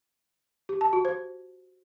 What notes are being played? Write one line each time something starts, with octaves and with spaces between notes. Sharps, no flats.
G4
A5
F#4
C5